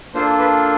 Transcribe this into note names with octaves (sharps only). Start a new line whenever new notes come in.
A#3 D4 F4 A4 C5
B4